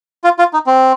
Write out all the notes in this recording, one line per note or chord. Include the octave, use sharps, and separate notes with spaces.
F4
F4
D#4
C4